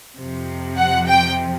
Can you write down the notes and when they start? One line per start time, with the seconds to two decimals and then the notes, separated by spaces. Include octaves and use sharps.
0.17 F2 C3 F3
0.78 F#5
1.08 G5